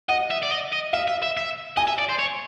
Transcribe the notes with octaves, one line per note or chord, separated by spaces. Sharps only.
D#5 F#5
E5
D5
D#5
D#5
E5 F5
E5
E5
E5
D#5 G#5
E5
D5
C5
C#5